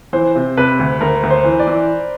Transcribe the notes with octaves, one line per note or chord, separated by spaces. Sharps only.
E3 C5
C3
C3 B4
D2
D2 A#4
D2
C5
E3
D5
E3